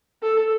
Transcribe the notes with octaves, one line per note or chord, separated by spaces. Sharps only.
A4